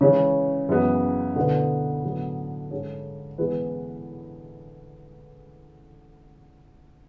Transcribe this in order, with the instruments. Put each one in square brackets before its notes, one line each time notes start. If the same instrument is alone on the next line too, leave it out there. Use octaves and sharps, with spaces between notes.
[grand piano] C#3 [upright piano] E3 G#3 C#4
[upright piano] F#2 E3 G#3 B3 F#4
[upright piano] B2 A3 E4 B4 [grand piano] D3
[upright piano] A2 F#3 B3
G#2 G#3 C#4
E3 G#3 B3 E4 B4